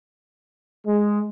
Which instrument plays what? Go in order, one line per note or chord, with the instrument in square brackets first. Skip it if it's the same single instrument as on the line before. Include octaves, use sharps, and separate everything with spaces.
[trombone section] G#3